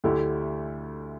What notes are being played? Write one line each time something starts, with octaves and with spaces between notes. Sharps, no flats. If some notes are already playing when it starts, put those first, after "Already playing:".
D2 D3 A3 E4 G4